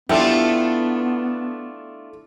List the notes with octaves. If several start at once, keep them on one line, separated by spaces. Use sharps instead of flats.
A3 B3 D4 E4 F4 G4 A4